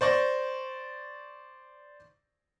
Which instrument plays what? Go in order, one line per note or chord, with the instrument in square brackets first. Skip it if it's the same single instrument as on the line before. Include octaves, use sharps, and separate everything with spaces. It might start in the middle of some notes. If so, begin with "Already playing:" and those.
[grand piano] C5 D5 C#6 A#6